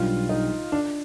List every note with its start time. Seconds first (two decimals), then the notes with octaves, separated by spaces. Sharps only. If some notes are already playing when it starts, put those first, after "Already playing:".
Already playing: B1 B2 G3 D4 F4
0.29 D#4
0.72 D4